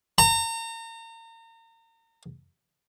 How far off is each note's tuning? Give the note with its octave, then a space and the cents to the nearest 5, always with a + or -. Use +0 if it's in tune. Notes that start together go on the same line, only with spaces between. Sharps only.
A#5 -35